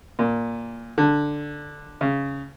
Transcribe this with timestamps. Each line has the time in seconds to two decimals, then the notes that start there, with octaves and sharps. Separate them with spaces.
0.19 A#2
0.98 D3
2.01 C#3